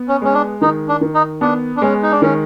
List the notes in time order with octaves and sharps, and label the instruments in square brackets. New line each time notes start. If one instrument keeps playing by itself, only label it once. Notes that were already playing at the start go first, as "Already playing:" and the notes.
Already playing: [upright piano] B3
[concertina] C#4
[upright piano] G#3 [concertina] C#4
[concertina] D4
[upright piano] D#3 [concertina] D#4
[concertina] D4
[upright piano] D#3
[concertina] D#4
[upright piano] B3 [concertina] D4
[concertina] D4
[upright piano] G#3 [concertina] C#4
[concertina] D#4
D4
[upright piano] D#3 [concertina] C#4